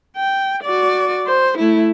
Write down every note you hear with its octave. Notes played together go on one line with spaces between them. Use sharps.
G5
F#4 D5
C5
A3 E4